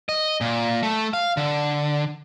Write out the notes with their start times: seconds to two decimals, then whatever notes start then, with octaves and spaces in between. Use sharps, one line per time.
0.09 D#5
0.41 A#2
0.83 A3
1.13 F5
1.37 D3